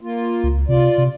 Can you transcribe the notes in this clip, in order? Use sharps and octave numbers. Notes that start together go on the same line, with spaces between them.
A#3 F4
C#2
C3 F4 D5
C3